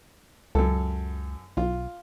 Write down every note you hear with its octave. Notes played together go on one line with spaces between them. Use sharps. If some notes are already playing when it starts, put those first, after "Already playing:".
C#2 F#2 A4
B1 F4